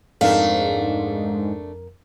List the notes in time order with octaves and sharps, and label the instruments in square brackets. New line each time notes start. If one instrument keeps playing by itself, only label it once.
[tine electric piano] F2 A#4 [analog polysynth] G#2 [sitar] A3 D4 [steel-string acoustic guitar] F5